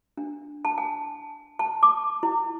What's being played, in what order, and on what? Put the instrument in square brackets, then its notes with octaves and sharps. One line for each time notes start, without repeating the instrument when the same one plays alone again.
[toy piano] D4
A5
G#5
A5
D6
E4